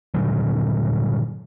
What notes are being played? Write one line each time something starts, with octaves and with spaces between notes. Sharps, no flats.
G2 A#2 D3 F#3